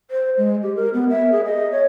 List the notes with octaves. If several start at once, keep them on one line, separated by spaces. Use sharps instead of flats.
C5
G#3
G4
A#4
B3
E5
G#4
D#5
C#5